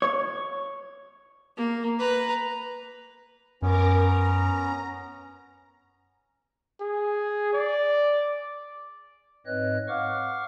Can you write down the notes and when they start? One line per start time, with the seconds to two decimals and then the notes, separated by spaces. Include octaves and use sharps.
0.02 C#5
1.57 A#3
1.99 B4 A#5
3.62 F#2 B3 C#4 A#4 A#5 D6
3.97 A#5
6.80 G#4
7.53 D5
9.46 G#2 C4 B4 C#5 D#5 F#6
9.88 F5 F#5 C#6 D6 F6